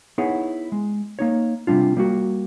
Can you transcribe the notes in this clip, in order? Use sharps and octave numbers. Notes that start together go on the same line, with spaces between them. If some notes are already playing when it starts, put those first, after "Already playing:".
B3 D#4 E4 G#4 C#5 F#5
G#3
A#3 D#4 C#5
C3 E3 G3 D4 F4
G3 A#3 F#4